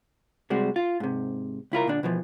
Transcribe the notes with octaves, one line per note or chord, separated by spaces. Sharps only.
C3 G3 G#3 F#4
F4
G#2 C3
C#2 E4 F4 A#4
A#2 D3 D4
B2 E3 F3